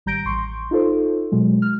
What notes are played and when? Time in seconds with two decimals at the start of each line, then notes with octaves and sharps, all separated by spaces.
0.06 G#1 G3 A#5 G6 A#6 D7
0.25 A1 C6 C#6
0.71 D#4 F4 A4 C5
1.32 B2 F#3 G#3
1.62 F6